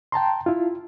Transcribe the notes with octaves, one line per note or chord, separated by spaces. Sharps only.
G5 A5 A#5 C6
E4 F4